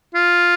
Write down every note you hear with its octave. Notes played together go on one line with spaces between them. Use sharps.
F4